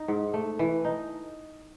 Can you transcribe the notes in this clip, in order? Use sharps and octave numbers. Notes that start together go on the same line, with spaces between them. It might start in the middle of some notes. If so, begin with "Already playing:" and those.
Already playing: D#4
G#2
A3
E3
D#4